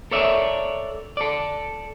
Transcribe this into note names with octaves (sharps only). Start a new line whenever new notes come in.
A4 A#4 C#5 D5 E5
A4 D5